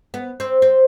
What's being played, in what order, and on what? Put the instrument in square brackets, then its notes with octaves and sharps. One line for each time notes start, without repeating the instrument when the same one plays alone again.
[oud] B3
C4
C4